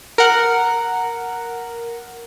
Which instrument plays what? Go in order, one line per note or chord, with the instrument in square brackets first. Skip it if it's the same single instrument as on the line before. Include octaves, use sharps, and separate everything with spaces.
[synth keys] A#4 F#5